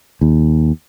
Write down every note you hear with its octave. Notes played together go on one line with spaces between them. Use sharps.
D#2